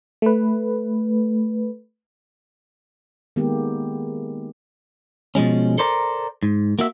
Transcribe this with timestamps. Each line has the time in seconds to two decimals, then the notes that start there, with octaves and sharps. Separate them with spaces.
0.22 A3 B4
3.36 D#3 G#3 A#3 B3 G4
5.35 B2 F3 G#3 C#4
5.78 A4 A#4 C5 D5 A#5
6.43 G#2
6.79 A#3 F#4 E5